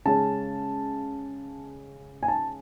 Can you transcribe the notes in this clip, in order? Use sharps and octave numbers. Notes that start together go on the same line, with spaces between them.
C#3 G#3 C#4 A5
G#5
A5